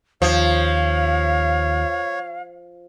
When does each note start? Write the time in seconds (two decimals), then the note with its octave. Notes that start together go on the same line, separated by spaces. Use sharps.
0.22 D#2 F3 C#5 F5